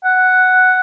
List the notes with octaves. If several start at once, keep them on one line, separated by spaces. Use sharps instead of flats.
F#5